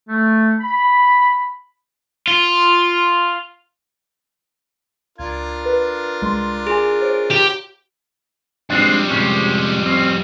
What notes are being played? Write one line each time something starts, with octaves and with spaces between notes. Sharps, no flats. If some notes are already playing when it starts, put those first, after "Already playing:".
A3
B5
F4
C#2 D4 F4 A#4 G#6
B4
C2 G#3 C6
G#4 G#5 C6
C5 C#5 D7
G4
F2 G3 G#3 C4 D4
C3 G#3 C#4
C4 C#4